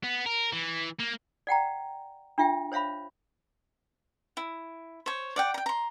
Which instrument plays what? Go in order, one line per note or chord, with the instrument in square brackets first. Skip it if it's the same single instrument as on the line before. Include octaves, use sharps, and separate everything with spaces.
[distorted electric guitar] B3
A#4
E3
A#3
[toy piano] D5 F#5 G5 A#5
D4 F4 E5 G5
C5 C#5 E5 F5 B5
[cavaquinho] E4
C5 C#5
D5 F#5 G5
G5 A#5
A#5 C6